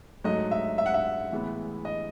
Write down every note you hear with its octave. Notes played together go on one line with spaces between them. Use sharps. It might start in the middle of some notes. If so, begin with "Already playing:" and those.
G#2 F#3 A3 D#5
E5
E5
F#5
E5
A2 E3 G#3 B3
D#5